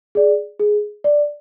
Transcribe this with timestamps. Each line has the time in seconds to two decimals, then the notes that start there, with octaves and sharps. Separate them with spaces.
0.15 G#4 D5
0.59 G#4
1.04 D5